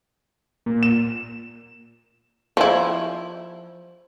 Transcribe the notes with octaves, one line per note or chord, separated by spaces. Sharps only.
A#2
E7
F3 E4